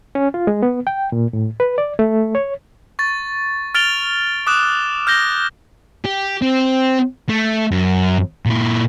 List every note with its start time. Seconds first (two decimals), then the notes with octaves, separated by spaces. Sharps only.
0.15 C#4
0.34 F4
0.47 G#3
0.63 B3
0.87 G5
1.12 A#2
1.33 A2
1.60 B4
1.78 D5
1.99 A3
2.35 C#5
2.99 C#6 A6
3.75 F6 A6 D7 F7 G7
4.47 D6 D#6 F#6 E7
5.07 F6 G6 A#6 G7
6.06 G4
6.42 C4
7.29 A3
7.71 F#2
8.46 A#2 E4